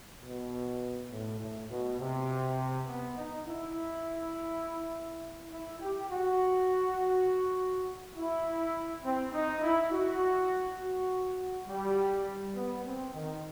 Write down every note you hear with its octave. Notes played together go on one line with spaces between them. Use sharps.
B2
A2
A2
B2
C3
B3
D#4
E4
E4
G4
F#4
E4
C4
D#4
E4
F#4
F#4
G3
B3
C4
D#3